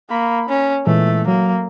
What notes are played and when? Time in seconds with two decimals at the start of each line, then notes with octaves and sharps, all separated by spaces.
0.11 A#3 B5
0.49 C#4
0.86 A#2 E3 G#3 A3
1.27 F#3 A#3